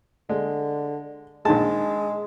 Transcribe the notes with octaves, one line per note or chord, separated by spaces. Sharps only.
D3 G#3
A#1 D#3 G#3 A5